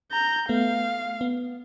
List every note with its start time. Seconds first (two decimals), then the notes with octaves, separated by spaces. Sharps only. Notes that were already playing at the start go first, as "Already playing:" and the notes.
0.12 A#5 G6
0.49 A3 B3 F5
1.21 B3